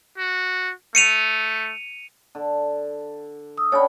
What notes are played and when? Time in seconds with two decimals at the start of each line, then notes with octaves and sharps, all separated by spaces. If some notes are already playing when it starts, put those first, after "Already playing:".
0.18 F#4
0.95 A3 C#7 D#7 F7
2.35 D3
3.58 D#6 E6
3.72 D3 C#4 C#5 G5 B5